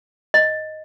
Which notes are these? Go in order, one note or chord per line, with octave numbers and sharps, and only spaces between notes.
D#5